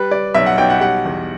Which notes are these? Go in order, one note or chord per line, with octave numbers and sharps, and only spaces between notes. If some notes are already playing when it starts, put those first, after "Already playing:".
Already playing: G3 B4
G3 D5
B1 E5
F#5
B1 G5
F#5
G3 F#5
E2